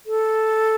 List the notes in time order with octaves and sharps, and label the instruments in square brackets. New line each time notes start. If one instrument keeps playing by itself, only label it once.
[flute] A4